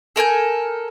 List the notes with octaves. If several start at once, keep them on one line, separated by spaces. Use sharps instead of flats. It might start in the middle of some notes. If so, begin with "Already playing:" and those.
A4 A#4 G#5 G6